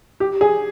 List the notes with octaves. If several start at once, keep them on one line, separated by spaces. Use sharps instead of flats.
G4
G#4